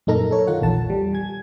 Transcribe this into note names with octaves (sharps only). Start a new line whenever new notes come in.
F#2 A#2 D#4 A4 A#4 A#5
A4 C#5
D#3 F4 F#5
A#1 E2 A5
G3
G#5 G#6